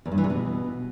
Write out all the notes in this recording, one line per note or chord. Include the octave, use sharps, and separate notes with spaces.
E2
G2
E3
C3
B2